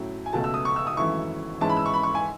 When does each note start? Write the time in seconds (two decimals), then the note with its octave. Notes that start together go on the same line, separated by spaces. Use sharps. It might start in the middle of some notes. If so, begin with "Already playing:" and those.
Already playing: A2 F#3 A3 C#4 E4
0.26 G#5
0.33 C#2 B2 A3 A5
0.44 E6
0.54 D#6
0.65 C#6
0.76 E6
0.87 D#6
0.97 G#1 F#2 E3 A3 E4 C#6
1.61 G#2 E3 G#3 C#4 E4 A5
1.69 B5
1.77 E6
1.86 C#6
1.94 B5
2.03 C#6
2.15 G#5